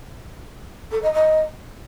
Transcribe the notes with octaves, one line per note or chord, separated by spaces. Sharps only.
A4
D#5
D#5